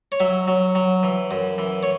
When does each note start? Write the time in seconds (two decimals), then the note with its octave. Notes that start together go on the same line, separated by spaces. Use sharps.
0.12 C#5
0.20 F#3 E5
0.48 F#3
0.75 F#3
1.03 E3
1.31 F#2
1.58 E3
1.83 C#5